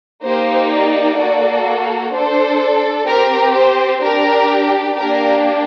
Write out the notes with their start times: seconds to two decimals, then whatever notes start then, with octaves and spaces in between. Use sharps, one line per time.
0.23 A#3 D#4 G4 C5
0.70 D5
1.18 A#3 F#4 A4
2.12 D4 A4 C5
3.07 C4 G4 A#4
3.55 C5
4.02 D4 G4 A#4
4.96 A#3 D4 G4 A#4